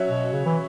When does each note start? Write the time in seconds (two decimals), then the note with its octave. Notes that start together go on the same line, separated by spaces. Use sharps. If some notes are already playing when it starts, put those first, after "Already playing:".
Already playing: F#3 C#4 F#4 C#5 E5
0.09 B2
0.33 C#3
0.46 E3